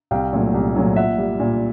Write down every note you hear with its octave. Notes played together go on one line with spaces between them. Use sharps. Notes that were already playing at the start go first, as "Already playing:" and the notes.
C2 F5 G5
A#2 F#3 A3
C2
A#2 F#3 A3
A#2 E5 F#5
G3
A#2